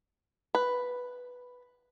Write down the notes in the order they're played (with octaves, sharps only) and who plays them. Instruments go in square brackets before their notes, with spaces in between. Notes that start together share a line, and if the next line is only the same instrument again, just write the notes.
[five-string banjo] B4